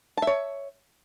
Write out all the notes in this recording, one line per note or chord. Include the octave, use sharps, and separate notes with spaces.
C#5 E5 A5